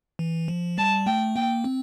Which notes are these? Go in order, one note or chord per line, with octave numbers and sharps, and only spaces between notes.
E3
F3
G3 A5
A3 G5
A#3 G5
C4